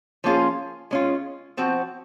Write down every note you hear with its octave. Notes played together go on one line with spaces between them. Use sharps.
F3 A#3 C#4 F4 G#4
G#3 C#4 F4
F3 C4 F#4